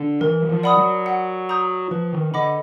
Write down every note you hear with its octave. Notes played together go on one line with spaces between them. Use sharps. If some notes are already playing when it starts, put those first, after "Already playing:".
Already playing: D3
E3 A#4
F#3
F3
D5 F#5 B5 D#6
F#3
F#5
A#5 D#6 G6
F3 B4
D#3
D3 D#5 F#5 B5 D6